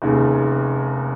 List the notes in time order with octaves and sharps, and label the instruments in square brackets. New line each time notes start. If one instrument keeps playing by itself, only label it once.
[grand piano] F1 D#2 C#3